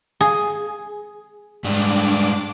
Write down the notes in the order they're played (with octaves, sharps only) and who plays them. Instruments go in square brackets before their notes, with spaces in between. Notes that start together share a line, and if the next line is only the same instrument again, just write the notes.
[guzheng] G#4
[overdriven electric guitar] G#2 G3 [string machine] D4 D6